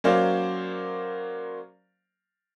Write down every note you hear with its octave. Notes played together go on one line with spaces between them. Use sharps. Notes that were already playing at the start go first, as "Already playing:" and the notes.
F#3 A#3 C#4 C5 D5 F5